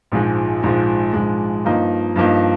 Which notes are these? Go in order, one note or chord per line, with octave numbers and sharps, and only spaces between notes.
A#1 G#2 F3 G#3
A#1 G#2 F3 G#3
A#1 G#2 F3 G#3
G2 F3 A#3 D#4
G2 F3 A#3 D#4